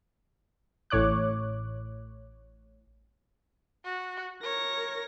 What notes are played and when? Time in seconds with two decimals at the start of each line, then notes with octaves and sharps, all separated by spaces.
0.90 A1 A2 C#5 D6 F#6
3.85 F#4
4.43 A#4 C#5 A#6